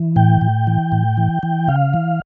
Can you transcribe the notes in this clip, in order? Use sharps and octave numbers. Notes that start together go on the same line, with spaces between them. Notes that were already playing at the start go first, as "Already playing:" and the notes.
Already playing: E3
A2 G5
A2
E3
A2
E3
E3
C#3 F5
E3